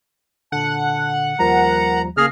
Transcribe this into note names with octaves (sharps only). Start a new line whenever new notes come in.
A#2 D3 F#5 A5
D#2 F3 G3 A#4 A#5
C#3 A#3 G#4 F6 A#6 C7